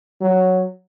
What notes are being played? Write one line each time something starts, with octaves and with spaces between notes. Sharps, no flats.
F#3